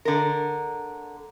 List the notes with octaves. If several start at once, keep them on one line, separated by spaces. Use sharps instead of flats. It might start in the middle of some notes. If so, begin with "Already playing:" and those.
D3 A#4